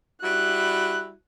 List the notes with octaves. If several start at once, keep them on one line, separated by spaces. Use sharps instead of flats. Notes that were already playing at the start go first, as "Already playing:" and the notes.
G3 E4 F#4 F#6